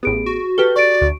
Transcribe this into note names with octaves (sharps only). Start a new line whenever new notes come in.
A1 B3 G4 G#4 D7
F#4
G4 A4 B4 F6 G7
D5 C#6 D7
D2